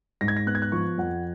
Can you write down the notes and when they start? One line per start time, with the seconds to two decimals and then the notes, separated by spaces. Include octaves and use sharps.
0.21 G#2 A#6
0.28 G#6
0.37 A#6
0.46 B3 F#6
0.55 G#6
0.62 F#6
0.72 F3 C#6
0.98 F2 F#5